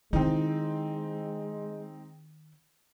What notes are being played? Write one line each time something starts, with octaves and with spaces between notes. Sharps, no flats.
D#3 G#3 C4 D#4 E4